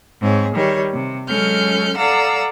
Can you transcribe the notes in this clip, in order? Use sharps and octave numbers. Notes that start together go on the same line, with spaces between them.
G#2 C4 G#4 C#5
D#3 G3 C#5
C3
F#3 G#3 C#4 A4 F6 G6
A4 D5 F5 F#5 A#5 E6